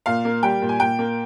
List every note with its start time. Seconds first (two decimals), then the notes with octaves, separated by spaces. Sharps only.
0.06 A#2 F5
0.25 A#3
0.43 G3 G5
0.62 A#2
0.69 G#5
0.80 A#2 G5
0.99 A#3